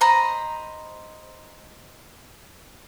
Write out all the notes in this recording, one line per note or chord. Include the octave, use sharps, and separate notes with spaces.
C5 D#5 A#5 B5